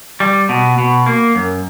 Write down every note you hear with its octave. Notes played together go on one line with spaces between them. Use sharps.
G3
B2
B2
A#3
F#2